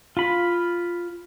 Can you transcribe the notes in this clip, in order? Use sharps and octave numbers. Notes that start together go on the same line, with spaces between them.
F4 B5